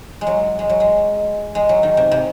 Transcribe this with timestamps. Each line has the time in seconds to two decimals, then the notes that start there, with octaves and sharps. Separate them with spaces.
0.21 G#3
0.27 F#3
0.59 G#3
0.69 F#3
0.80 G#3
1.55 G#3
1.69 F#3
1.83 D#3
1.97 C3
2.11 C3